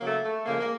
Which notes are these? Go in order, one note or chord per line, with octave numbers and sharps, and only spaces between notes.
C#3 F#3 A3 A#3
A3
C#3 F3 G#3 A#3
A#3